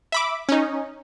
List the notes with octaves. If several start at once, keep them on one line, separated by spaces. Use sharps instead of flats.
E5 B5 D6
C#4 D#4